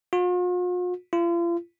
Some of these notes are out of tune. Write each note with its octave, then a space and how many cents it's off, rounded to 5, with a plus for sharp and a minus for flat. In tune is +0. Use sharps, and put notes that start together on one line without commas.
F4 +45
F4 -40